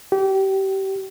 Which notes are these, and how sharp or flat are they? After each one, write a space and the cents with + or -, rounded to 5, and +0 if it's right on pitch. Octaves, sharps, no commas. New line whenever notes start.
G4 -30